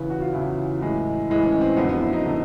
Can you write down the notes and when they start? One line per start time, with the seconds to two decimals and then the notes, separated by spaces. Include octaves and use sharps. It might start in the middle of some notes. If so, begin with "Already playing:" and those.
Already playing: E2 C#3 E3 B4
0.10 F#4
0.22 F4
0.33 E2 C#3 E3 E4
0.81 A2 E3 G#3
1.30 A2 E3 G#3
1.45 C#4
1.61 C4
1.77 F2 D3 F#3 B3
1.89 B3
2.00 E4
2.13 D#4
2.26 D3 F#3